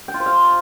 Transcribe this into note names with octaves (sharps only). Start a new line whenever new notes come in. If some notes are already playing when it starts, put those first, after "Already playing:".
G5
F4
C5
F5